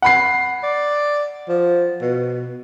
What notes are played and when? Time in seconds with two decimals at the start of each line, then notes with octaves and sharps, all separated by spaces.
0.02 F#5 B5 C7
0.63 D5
1.49 F3
2.02 B2